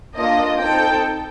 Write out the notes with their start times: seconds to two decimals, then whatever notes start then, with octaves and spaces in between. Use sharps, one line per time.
0.15 A#3 D4 F4 A4 D#5
0.59 C4 D#4 A4 G5